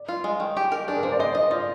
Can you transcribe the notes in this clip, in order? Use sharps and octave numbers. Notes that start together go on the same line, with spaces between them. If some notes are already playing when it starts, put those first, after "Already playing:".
Already playing: D5
F4
G#3
D#3
G4
A#4
D4 G#4
A#4
A#3 C5
D5
C5 D#5
D#5
F4 D5